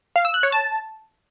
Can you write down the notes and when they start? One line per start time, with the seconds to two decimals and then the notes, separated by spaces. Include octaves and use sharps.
0.16 F5
0.25 E6
0.34 F#6
0.43 C#5
0.52 A5